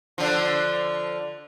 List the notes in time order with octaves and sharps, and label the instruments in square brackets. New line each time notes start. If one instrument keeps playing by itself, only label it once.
[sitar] D3 F3